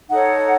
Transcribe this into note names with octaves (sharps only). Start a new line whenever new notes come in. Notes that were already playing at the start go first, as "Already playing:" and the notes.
D#4 A4 C#5 F#5